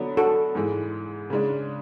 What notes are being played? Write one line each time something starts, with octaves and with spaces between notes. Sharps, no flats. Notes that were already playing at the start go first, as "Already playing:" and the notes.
Already playing: D3 F#3 B3 D4
F#4 A4
G#2 E3 G#3
C#3 G#3 D4